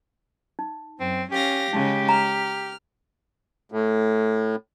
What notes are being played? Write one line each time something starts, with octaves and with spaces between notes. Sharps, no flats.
D#4
F#2 C4
C#4 G4 F5 A#6
C#3 G#3 D#4
A#5 F6
A2